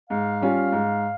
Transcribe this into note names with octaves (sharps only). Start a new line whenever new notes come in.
G#2 F5
G3 C#4 F4
G#2